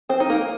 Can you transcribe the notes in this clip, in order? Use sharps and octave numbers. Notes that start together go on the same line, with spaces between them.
C4 C5
D#4
A#3 A#4